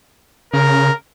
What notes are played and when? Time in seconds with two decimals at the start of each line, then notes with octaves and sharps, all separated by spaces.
0.53 C#3 A#4